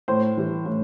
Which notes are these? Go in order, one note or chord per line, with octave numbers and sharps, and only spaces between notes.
A2 C5
E3 G3
A2